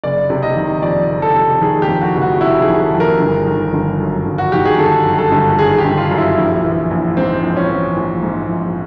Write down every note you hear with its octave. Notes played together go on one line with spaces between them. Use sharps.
F#1 D5
C3
D#5
D#3
F2 D5
F#1
A4
C3
D#3 G#4
G4
F2
F#4
F#1
F#4
C3 E4
G#4
D#3
A4
F2
A#4
G1
D#3
G1
F#2
G1
F#4
D#3 G4
G#4
G1 A4
F#2
A4
G1
D#3 G#4
G4
G1
F4
F#2
E4
A#1
E3
A#1
G#2 C4
A#1
C#4
E3
A#1
G#2
A#1